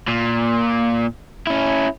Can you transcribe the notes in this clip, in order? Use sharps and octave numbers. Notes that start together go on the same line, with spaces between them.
A#2
C#4 E4